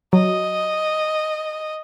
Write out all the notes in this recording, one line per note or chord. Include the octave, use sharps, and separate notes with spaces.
F#3 D#5